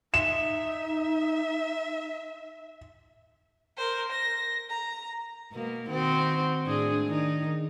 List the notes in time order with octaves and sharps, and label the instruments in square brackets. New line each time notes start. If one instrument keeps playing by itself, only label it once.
[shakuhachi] D#4 [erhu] E5 [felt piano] E7
[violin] A#4 C5
A#6
A#5
[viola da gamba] B2 A#3
D#3 C4 F#4
A2 D4 G#4
D#3 D#4